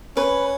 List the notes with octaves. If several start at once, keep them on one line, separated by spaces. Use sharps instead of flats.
C#4 B4